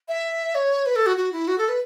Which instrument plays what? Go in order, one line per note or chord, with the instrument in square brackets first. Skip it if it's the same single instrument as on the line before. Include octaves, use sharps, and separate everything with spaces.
[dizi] E5
C#5
B4
A4
F#4
F#4
E4
F#4
A4
B4